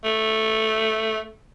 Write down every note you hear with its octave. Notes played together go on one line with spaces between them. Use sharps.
A3